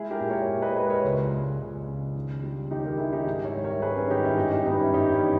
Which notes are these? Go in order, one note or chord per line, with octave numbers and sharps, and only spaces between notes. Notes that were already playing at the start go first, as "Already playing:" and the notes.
Already playing: G#3 E4 G#4
G4 A#4
A#2
A#4 C#5
A#2
B4 D#5
G#3 B4 D#5
A#4 C#5
C#2
G#3
C#2
C#3
D#2
G3
D#2 D#4 G4
G4 A#4
D#3 E4 G#4
D#4 G4
G#2
C#5 E5
G3
A#4 C#5
G#2 G#4 B4
C#4
D#3 D#4 G4
C#4 E4
G2 D#4 G4
D#4 G4
G3 B3 D#4
C#4 E4
G2 D#4 G4
C#4 E4
E3